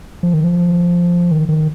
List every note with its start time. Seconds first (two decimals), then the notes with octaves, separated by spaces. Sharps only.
0.23 F3
0.33 D#3
0.44 F3
1.31 D#3
1.49 D#3